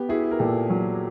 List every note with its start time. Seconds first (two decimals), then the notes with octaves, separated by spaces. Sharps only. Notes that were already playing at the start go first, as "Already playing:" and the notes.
Already playing: B3 G4
0.09 E4 F#4 G#4
0.31 A#4
0.39 A#2 G4 A4
0.70 F#3